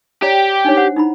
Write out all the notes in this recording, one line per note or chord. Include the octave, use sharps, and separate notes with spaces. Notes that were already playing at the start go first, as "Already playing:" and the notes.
G4 C#5 D5 A#5
D4 D#4 C#5
C5 F#5
D#4 E4 B5